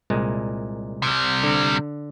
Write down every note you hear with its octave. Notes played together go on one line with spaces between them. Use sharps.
C2 A#2 G#3
C3 G3
D3